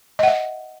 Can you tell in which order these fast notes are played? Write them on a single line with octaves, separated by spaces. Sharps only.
D#5 F#5 E5